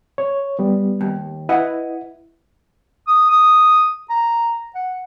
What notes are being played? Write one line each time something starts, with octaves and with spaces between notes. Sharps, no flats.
C#5
G3 B3
D#2
E4 B4 D#5 F#5
D#6
D#6
A#5
F#5